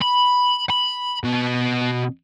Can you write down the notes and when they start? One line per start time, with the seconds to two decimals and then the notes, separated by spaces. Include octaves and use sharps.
0.01 B5
0.70 B5
1.24 B2